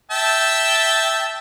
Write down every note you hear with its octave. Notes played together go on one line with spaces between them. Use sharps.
E5 G5 A5